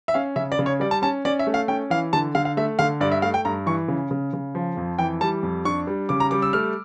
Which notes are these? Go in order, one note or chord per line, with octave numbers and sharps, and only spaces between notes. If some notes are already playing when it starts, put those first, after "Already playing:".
E5
C#4 F5
C#3 E5
D5
C#3
C#5
G3 D5
A5
C#4 A5
C#4 D5
E5
A3
F5
C#4 G5
E3 F5
D3 A5
D3 F5
F5
A3 E5
D3 F5
G2 D5
E5
A3 F5
G5
G2 A#5
E3 C#6
C#3
C#3
C#3
F3
F2
E3 G5
G3 A5
F2
D4 C#6
G3
C#3 D6
A#5
G3 D6
E6
A3 F6